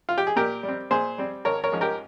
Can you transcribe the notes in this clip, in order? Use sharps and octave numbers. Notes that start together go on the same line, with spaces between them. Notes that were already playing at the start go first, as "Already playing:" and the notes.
F4
G4
G#4
A#2 G4 A#4
G3
C4
A#2 G#4 C5
G3 C4
G#1 A#4 C#5
A#4 C#5
G#2 F3 G#3 C#4
G4 A#4